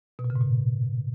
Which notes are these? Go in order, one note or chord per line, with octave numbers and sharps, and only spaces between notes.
B2
A#2
C#3
G#2
A#2